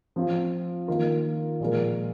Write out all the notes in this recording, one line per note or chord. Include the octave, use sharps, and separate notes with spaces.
F3 C4 F4
D#3 A#3 F4 A#4
A#2 F3 G#3 F4 A#4